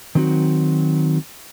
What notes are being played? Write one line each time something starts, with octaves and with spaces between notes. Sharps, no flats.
D#3 F#3 C4 D#4 F#4